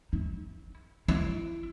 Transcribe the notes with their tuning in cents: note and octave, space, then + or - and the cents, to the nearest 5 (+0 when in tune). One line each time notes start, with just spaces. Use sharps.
E4 -25
E4 +25